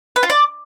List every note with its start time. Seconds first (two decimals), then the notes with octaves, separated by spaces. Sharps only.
0.16 B4
0.23 F4
0.30 D5